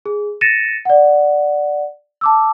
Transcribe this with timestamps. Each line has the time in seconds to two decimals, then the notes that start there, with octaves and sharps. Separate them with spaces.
0.06 G#4
0.41 A6 A#6 C#7 D#7 E7
0.85 D5 F#5
2.21 A5 D6 E6